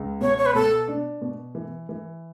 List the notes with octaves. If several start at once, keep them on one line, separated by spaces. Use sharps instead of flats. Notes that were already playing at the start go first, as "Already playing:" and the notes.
Already playing: C#2
B2 C#5
C#5
B4
B2 A4
D4
B2
E3
E3